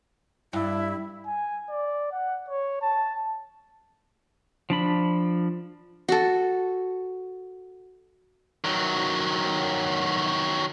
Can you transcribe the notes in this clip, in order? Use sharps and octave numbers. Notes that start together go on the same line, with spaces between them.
G2 E4
G#5
D5
F#5
C#5
A5
F3 D4 B5
F#4 A4
D#3 F#3